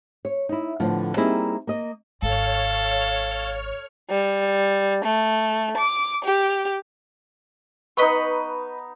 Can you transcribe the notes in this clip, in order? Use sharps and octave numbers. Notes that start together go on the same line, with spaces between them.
C#5
D#4 E4
A2 D3 F3 B3 F4
G3 A#3 C4 D#4 E4 G#4
A#3 D#5
G#1 A4 C#5 F5 F6
G3
A3
D6
G4
B3 D#4 B4 D#5 C#6